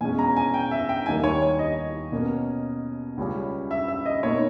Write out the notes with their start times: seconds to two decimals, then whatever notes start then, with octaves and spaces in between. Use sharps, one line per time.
0.01 E2 B2 G#3 C#4 G#5
0.19 A#5
0.37 G#5
0.54 G5
0.71 E5
0.89 G5
1.06 D#2 D#3 G3 A#3 G#5
1.24 C#5
1.42 C#5
1.59 D#5
2.12 B2 A#3 C#4
3.17 C#2 C#3 G3 C#4
3.71 E5
3.88 E5
4.06 D#5
4.23 B2 A#3 D#4 C#5